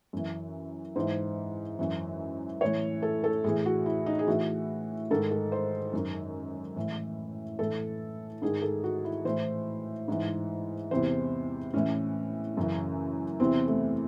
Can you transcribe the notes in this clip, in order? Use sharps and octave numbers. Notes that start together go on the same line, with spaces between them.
F#2 E3
G#2 E3 C5
F#2 E3
A2 E3 C#5
A4
A4
A2 E3 G#4
F#4
E4
D#4
G#4
A2 E3 F#4
G#2 D#3 A4
A4
C5
F#2 D#3
A2 E3
A2 E3 A4
G#2 D#3 G#4
A4
F#4
E4
A2 E3 C5
G#2 E3
E2 C3 E3 C5
A2 E3 C#4
F#2 C#3 E3
E2 C3 E3 C4
A3